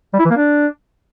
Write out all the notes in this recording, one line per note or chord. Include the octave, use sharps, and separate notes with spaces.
G3
E4
E3
A#3
D4